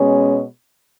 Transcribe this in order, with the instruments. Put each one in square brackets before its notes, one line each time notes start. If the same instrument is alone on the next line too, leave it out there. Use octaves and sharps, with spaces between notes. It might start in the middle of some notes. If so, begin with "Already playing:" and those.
Already playing: [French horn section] B2 G#3 C#4